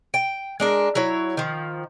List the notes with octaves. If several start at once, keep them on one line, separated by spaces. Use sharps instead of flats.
G5
G#3 D4 A#4
F#3 E4 C#5
D#3 F3